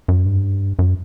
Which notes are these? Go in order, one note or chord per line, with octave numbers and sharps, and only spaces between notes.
F#2
G2
F#2